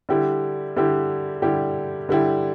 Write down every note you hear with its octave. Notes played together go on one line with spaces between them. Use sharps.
D3 G3 E4 G4
D3 G3 E4 G4
D3 G3 E4 G4
D3 G3 E4 G4